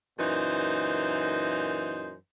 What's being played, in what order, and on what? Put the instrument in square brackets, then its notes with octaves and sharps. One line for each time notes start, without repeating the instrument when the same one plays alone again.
[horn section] F#2 A#2 E3 D#4 C5